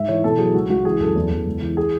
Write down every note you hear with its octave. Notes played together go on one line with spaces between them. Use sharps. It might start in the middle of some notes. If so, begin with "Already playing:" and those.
Already playing: G#2 E5
E3 C#5
B2 A4
F#3 G#4
C#2 F#4
C#2 F#4
E3 G#4
F#2 A4
E2
E2
C#2
E3
G#4